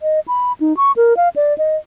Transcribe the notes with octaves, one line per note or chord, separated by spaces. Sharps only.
D#5
B5
D#4
C#6
A#4
F5
D5
D#5